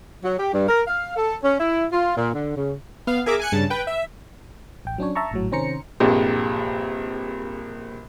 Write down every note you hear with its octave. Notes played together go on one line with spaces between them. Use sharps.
F#3
G4
G2
A#4
F5
A4
C#4
E4
F4
A#2
D3
C#3
B3 F5
G#4 A#4 E5 D6
G#5 F#6 C#7
G2 C#3 A5
B4 G5
E5
A1 G5
F#3 C#4 D4 C#5
E5 A5 A#5 C#6
G#1 A2 F#3
C3 D#3 C#4 C5 A#5 C#7
A#1 G2 C3 G3 G#3